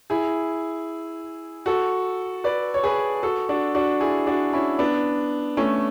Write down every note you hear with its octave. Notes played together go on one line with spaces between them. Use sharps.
E4 G#4
F#4 A4
B4 D5
C#5
G#4 B4
F#4 A4
D4 F#4
D4 F#4
E4 G#4
D4 F#4
C#4 E4
B3 D4
A3 C#4